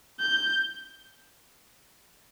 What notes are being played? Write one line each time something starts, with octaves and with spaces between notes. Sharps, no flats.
G6